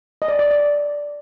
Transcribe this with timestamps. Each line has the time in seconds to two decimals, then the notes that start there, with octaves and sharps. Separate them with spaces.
0.22 D#5
0.28 D5
0.39 D5
0.51 D5